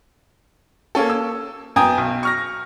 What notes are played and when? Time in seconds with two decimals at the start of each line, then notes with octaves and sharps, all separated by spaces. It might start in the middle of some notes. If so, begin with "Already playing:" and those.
0.95 A#3 C#4 A4
1.10 E6
1.76 F#2 B3 G5 G#5 A#5 D#6
1.98 B1
2.23 C#6 F6 A#6